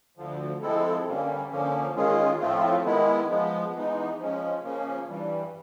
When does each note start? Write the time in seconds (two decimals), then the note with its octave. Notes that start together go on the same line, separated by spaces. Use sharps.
0.17 D2 D3 F3
0.62 F3 G#3 C4 E4 A4
1.06 G2 D3 G3 A#3 C#4
1.51 D3 F3 A#3 C#4
1.96 D#3 G#3 C#4 F4 G#4
2.40 A2 F3 A3 C4 F4
2.85 D#3 G#3 B3 E4
3.29 F3 G#3 B3
3.74 E3 G#3 B3 D#4
4.19 F3 G#3 C#4
4.63 C#3 F3 A#3 C#4
5.07 G2 E3 G3